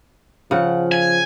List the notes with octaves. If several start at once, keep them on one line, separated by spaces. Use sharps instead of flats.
C#3 F3 F#5
G#5